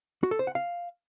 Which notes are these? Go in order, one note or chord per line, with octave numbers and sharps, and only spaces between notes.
F#4
A4
C5
F#5
F5